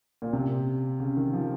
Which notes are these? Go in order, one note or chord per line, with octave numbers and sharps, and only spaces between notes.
A#2
C3
C#3
D#3
F3